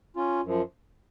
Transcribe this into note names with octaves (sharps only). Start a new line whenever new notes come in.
C#4 F4
F#2 F3